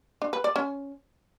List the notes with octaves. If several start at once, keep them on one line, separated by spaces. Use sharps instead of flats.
D4
B4
D5
C#4